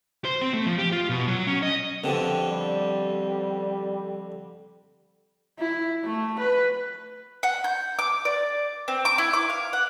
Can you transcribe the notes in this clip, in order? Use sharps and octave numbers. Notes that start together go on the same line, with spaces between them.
C5
C4
A3
F3
G4
F4
B2
F#3
C#4
D#5
F2 D3 B3 C4 G4
G3
E4
A3
B4
F#5
G6
D6
D5
C4
D6
E4
D6
F5
F#5